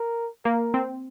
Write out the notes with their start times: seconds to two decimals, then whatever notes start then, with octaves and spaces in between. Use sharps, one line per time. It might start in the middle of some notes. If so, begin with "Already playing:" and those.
Already playing: A#4
0.45 A#3 A#4
0.74 C4